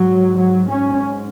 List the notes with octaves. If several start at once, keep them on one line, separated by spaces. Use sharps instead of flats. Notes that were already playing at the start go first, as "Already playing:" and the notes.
Already playing: G#2 F#3
F#3
C#4